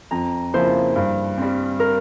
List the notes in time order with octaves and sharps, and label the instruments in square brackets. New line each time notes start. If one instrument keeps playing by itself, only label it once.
[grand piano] F2 [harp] A#5
[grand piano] C#3 F3 A#3 E4 [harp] C5
[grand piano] G2
G3 C4
[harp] A#4